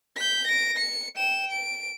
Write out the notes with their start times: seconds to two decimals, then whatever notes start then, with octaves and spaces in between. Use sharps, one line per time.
0.16 G6 B6
0.48 A#6 D7
0.78 C#7
1.17 G5 E7
1.51 D7